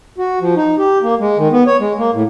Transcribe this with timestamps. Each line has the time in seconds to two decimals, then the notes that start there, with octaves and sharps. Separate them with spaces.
0.18 F#4
0.41 F3
0.56 D#4
0.78 G4
1.02 A#3
1.20 G#3
1.38 D#3
1.52 B3
1.66 C#5
1.80 G#3
1.99 A#3
2.14 A2